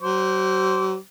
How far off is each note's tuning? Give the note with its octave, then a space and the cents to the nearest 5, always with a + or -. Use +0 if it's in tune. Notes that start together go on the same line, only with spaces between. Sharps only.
F#3 +40 C5 +0 D6 -35